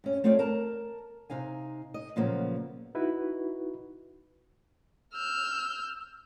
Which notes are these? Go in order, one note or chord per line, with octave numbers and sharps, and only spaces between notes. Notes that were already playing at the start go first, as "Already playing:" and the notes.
G2 C#4
A3 C4 F4 C#5 D5
A#4 A5 A#5
C3 D#4 F5 G#5
D#5
A#2 C#3 F3 F#3 A#3 B3
D#4 E4 F#4 B4
E6 F6 G6